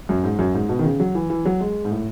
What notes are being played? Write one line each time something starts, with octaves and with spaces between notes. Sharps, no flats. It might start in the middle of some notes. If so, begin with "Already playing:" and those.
F#2
G#2
F#2
G#2
B2
D#3
C#3
F#3
E3
E3
F#3
G#3
G#2
A2